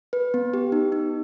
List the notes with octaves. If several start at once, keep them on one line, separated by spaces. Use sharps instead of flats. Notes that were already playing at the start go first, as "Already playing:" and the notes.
B4
B3
G4
D#4
D#4